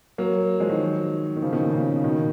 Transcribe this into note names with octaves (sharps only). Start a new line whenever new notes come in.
F#3 A#3
F3 G#3
D#3 F#3
D#3
C#3 F3
B2 D#3
A#2
A#2 C#3
B2 D#3